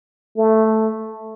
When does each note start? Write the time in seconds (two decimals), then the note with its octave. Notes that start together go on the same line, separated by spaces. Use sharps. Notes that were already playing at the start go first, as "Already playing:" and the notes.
0.37 A3